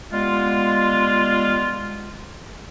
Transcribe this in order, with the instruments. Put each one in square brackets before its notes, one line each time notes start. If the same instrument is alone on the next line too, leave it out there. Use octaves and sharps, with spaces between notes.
[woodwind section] G3 G#3 B3 F4